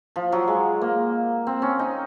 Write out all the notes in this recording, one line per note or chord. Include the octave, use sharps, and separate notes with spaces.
F3
F#3
G#3
A#3
C4
C#4
D#4